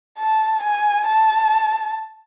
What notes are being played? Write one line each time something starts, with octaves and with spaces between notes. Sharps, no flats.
A5
G#5
A5